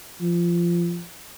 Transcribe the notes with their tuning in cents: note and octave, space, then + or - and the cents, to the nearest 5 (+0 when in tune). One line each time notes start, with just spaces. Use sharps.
F3 -20